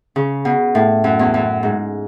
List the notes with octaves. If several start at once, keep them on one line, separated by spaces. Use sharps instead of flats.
C#3
B2
A2
F#2
E2
F#2
G#2